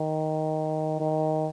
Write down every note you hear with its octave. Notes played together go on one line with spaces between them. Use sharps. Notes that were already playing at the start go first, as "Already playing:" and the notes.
Already playing: D#3
D#3